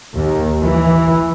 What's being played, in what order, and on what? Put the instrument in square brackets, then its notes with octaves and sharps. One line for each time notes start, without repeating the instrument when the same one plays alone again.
[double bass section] D#2
E3